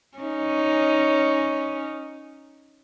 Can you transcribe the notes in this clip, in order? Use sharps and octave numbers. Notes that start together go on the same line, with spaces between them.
C#4 D#4